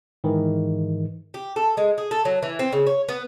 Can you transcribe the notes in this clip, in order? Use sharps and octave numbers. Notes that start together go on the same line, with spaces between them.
G#2 D#3 E3
G4
A4
G#3
G#4
A4
F#3
E3
C4
C#3
C#5
B3